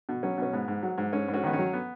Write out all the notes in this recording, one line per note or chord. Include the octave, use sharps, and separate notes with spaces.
B2
F#3 C#4
B2 C#4
G#2 B3
G#2
F#3
G#2
G#2 C#4
G#2
C#4 F#4
D#3 B3
C#4
F#3
B3